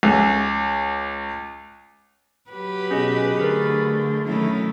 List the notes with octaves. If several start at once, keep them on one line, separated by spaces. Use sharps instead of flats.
C#2
F#3 G4 B4
B2 C#4 G#4 D#5
D3 A3 G#4 A#4
D#3 F#3 A3 C#4 E4